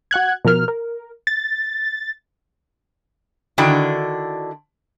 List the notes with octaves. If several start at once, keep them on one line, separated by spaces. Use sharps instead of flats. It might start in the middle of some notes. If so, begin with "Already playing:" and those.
F#4 F#5 F#6 G#6
B2 F3 A#4 F6
A#4
A6
D3 D#3 D4 E4 F#4 G5